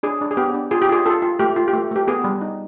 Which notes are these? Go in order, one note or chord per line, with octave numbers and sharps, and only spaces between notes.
D4 G#4
D4
G#4
B3 G4
D4
F4 G#4
G4
F4 G#4
F4 A4
F4
A3 G4
F4
G4
A3
A3 G4
B3 G#4
G3
D#4